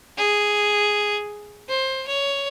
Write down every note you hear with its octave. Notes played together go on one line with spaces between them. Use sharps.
G#4
C5
C#5